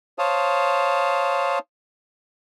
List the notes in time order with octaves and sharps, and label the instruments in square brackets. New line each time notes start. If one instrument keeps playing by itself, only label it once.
[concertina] C5 C#5 F5 A5 D#6